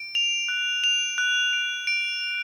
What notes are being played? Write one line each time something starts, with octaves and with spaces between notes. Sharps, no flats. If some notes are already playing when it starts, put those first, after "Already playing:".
Already playing: D7
F7
F#6
F7
F#6
D7
D7
F7